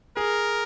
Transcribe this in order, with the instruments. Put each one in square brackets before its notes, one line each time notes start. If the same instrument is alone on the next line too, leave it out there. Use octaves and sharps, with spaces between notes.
[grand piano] G#4 [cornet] A#4